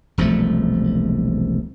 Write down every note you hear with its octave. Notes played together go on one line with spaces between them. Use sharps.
E1 C2 F3 A3